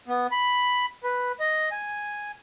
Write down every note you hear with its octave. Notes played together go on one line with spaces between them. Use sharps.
B3
B5
B4
D#5
G#5